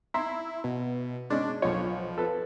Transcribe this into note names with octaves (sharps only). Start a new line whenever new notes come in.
E4 A#5 C6
B2
G#3 C#4 D4
B1 F3 C#5
A4 B4